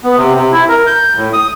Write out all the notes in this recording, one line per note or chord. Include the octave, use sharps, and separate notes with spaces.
B3
C3
C3
E4
A#4
G6
A2
D#6